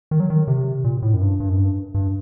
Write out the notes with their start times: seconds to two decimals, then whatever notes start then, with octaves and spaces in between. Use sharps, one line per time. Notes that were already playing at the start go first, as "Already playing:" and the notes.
0.11 D#3
0.20 F#3
0.30 D#3
0.48 C3
0.84 A#2
1.02 A2
1.14 F#2
1.22 G2
1.40 G2
1.50 F#2
1.58 G2
1.94 G2